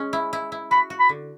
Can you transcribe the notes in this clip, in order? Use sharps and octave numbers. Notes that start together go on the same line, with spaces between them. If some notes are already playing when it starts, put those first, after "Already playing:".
Already playing: G#3 C#4
E4
E4
E4
F#4 B5
F#4
B5
D3